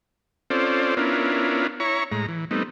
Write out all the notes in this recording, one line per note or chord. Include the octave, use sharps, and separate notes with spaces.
C4 C#4 F4 A4 C5 D5
B3 C#4 D4 E4 F4 A#4
E4 C#5 A#5 C#6
A2 G#3 A#5
E3
G3 A3 B3 C4 D#4